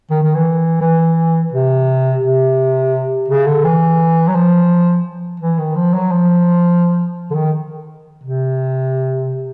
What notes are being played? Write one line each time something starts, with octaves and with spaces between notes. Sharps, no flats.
D#3
D#3
E3
E3
C3
C3
C#3
D3
E3
F#3
F3
E3
D#3
F3
F#3
F3
D3
D#3
C3